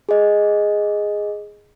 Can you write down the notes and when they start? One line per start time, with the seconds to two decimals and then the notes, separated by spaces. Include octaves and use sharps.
0.09 G#4 D#5